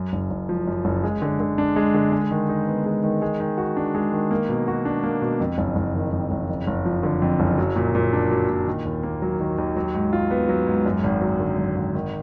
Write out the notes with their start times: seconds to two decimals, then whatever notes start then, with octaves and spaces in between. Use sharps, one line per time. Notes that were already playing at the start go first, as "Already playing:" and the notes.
Already playing: F#2
0.13 F#1
0.31 F#1
0.49 F3
0.67 F#2
0.85 F#1
1.04 G#3
1.22 D3
1.40 D3
1.58 D4
1.76 G#3
1.94 D3
2.12 G#3
2.31 D#3
2.49 D#4
2.67 B3
2.85 G#3
3.04 D#3
3.22 G#3
3.40 D#3
3.58 F#4
3.77 D4
3.95 G#3
4.12 D#3
4.31 A#3
4.49 B2
4.68 F#4
4.85 D4
5.03 A#3
5.22 B2
5.40 F2
5.58 F#1
5.76 F#1
5.94 D#3
6.12 F2
6.31 F#1
6.49 F2
6.67 F#1
6.85 F3
7.03 D3
7.22 F2
7.40 F#1
7.58 F#3
7.76 A#2
7.95 A#2
8.13 D4
8.31 F#3
8.49 A#2
8.67 D#3
8.85 D#2
9.03 A#3
9.22 F#3
9.40 D#3
9.58 D#2
9.76 F#3
9.94 G#2
10.13 F4
10.31 B3
10.49 F#3
10.67 G#2
10.86 F#2
11.04 G#1
11.22 F#3
11.40 D3
11.58 F#2
11.76 G#1
11.95 D#3